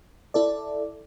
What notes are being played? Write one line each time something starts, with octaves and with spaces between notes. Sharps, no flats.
E4 A4 D5